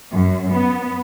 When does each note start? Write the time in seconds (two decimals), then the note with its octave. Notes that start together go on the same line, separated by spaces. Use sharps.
0.13 F#2
0.53 B3